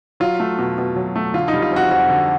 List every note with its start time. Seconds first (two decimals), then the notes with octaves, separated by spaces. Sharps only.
0.20 F#3 F4
0.40 A3
0.58 B2
0.78 B2
0.96 F#3
1.16 A3
1.34 D3 F4
1.48 D#4
1.53 G3
1.62 F4
1.72 F2 F#4
1.91 F2 F#4
2.09 D3